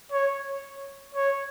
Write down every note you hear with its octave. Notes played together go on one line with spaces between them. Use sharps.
C#5
C#5